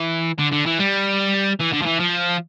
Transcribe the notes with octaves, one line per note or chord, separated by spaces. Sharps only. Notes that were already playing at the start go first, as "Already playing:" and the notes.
Already playing: E3
D3
D3
E3
G3
E3
D3
F3
E3
F3